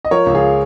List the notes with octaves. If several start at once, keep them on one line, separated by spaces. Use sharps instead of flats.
D#5
F3 A#4 C#5
C#2
F4 G#4